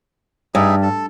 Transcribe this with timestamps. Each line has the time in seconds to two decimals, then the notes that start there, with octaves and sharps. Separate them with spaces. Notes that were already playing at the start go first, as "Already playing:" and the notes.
0.55 G2 D#4 G#4 E5
0.82 A4 A5